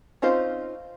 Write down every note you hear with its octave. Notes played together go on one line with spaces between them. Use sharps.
C4 C#4 D#4 F4 C5